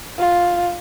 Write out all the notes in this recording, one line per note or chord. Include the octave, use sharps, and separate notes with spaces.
F4